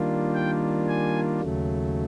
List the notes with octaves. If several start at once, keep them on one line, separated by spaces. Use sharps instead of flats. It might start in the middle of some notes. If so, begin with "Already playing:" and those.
Already playing: D#3 G3 A#3 D4 F4
G5
G#5
D#2 C#3 F#3 A3